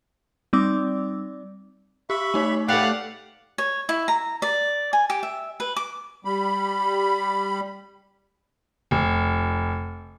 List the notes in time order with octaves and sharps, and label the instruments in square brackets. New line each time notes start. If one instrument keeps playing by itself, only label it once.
[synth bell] G3 C4 D#4 D5 D6 E6
[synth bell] G4 [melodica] E5 B5 C#6
[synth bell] A3 D#4 C#5
[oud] A3 G4 [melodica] B4 [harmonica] D5 F5 F#5 [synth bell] F#6 C7
[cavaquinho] C#5
E4
A#5
D5
G#5
G4
E5
B4
D6
[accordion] G3 B5
[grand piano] F1